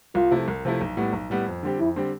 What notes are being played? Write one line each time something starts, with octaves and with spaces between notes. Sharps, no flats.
C2 F4
C3 F3 A3 E4
C2
C3 F3 A3 E4
B1
A2 G3 B3
B1
A2 G3 B3
F2
D3 G3 C4 G4
F2 E4
D3 G3 C4 G4